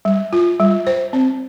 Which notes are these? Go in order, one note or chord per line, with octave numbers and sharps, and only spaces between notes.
G3
F4
G3
C5
C4